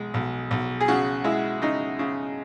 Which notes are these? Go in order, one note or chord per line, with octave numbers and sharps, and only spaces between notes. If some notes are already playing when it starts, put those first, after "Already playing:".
Already playing: B1 G#3
B1
B1
G#4
C#3 F#4
G#3 E4
C#3 D#4
C#3